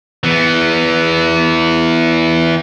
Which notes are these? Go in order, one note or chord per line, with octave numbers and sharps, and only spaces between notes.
E3 B3